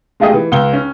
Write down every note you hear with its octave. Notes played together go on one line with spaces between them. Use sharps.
G#3 A3 F4 G4 G#4 D#5
E3
C#2 G7
C#4